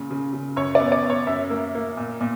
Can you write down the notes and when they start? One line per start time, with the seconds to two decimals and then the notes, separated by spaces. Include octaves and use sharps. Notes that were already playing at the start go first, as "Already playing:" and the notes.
Already playing: A#2 C#3
0.11 C#3
0.33 C#3
0.56 F#2 C#5
0.75 B3 D5
0.92 D5
1.04 B3
1.10 C#5
1.27 F#2 E5
1.50 A#3
1.75 A#3
1.97 A#2
2.21 A#2